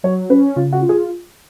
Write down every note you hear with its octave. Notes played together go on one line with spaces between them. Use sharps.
F#3 C#5
C#4 B4
C#3 F4
F#4
F4
G#4